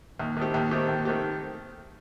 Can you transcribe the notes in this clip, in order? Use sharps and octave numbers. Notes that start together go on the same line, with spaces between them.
D#2
D#3 A3 C4 G4
D#2
D#3 A3 C4 G4
D#2
D#3 A3 C4 G4